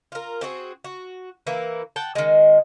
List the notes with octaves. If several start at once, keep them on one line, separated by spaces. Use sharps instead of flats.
F4 A#4
C4 F#4 G#4
F#4
E3 A#3 E4
F#5 G5 A5
D#3 G#3